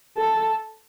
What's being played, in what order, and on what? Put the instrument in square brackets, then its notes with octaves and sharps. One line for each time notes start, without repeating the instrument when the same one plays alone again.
[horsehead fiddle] A4